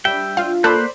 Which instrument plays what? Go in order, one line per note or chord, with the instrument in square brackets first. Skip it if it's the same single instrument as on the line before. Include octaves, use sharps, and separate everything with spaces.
[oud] G3 D4 [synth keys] E5 [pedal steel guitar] G5
[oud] D4 F4 [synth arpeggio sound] F5
[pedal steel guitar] A#3 F#6 G6 [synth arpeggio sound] A4 [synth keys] C5 D5 B5